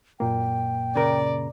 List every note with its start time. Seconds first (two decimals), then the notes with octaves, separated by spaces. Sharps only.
0.20 F#2 A#2 A#3 G5
0.96 C#3 A#4 D5